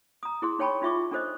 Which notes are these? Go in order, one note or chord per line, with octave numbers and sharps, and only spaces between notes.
A#5 D#6
E4 G#4 C6
D#4 C#5 G5 A5 B5 C#6
D#4 F4 E5 C#6 D6
D4 A4 C5 D#5